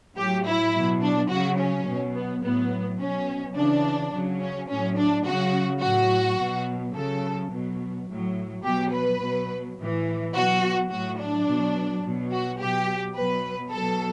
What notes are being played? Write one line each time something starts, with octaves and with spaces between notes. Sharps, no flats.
A2 F#3 G4
E4
B2 F#3
D4
C#3 F#3 F#4
C#4
B2 F#3
B3
A2 F#3 B3
B2 F#3 C#4
C#3 E3 D4
C#3 F#3
C#4
A2 F#3 C#4
D4
C#3 F#3 F#4
A2 F#3 F#4
B2 F#3
C#3 F#3 A4
B2 F#3
A2 F#3
B2 F#3 G4
B4
B2 F#3
A2 E3
B2 F#3 F#4
A2 F#3 F#4
D4
B2 F#3
B2 F#3
F#4
B2 F#3 G4
B2 F#3 B4
B2 F#3 A4